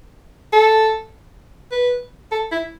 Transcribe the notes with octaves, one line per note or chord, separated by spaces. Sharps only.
A4
B4
A4
E4